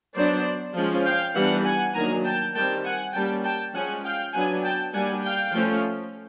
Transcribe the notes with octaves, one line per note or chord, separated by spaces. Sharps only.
F#3 B3 D4 C5 D5
F3 G#3 C#4
F5 G5
E3 G3 B3 D4 E5 F#5
F#5 G#5
D#3 F#3 A#3 D4 G#5 A#5
G5 A5
D#3 G3 C4 G5 A5
F#5 G#5
G3 A#3 C#4 G5 A5
G5 A5
F3 G#3 C#4 F#5 G#5
F5 G5
F#3 B3 D4 F#5 G#5
G5 A5
G3 A#3 D4 F#5 G#5
F5 G5
F3 A3 C#4